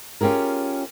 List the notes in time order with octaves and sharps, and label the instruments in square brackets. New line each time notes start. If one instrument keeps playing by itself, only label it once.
[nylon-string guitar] C#4 F4 G4 G#4 A#4